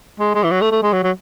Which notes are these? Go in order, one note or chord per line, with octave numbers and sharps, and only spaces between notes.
G#3
G#3
E3
F#3
A3
A3
G#3
F#3
F#3